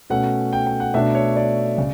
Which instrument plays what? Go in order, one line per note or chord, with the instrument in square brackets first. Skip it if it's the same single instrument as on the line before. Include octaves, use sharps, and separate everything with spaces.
[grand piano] B2 A3 C#4 F#5
G5
G5
F#5
B2 A3 D4 E5
C#5
D5
C#3